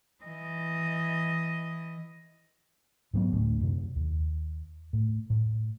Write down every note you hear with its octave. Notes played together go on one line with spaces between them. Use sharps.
E3 D#5
G#2 F#3 B3
D2 A2
F#2 C3
D#2
A2
A2